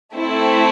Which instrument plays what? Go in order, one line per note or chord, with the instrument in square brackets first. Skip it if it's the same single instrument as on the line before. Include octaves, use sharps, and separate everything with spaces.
[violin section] A3 C4 E4 A4